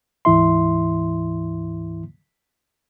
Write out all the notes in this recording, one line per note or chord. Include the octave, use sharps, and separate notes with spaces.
D2 G#2 E3 E4 E5 C6